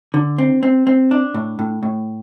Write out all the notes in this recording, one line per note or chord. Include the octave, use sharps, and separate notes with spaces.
D3
C4
C4
C4
D4
A2
A2
A2